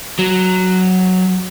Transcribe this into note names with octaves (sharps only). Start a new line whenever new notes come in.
F#3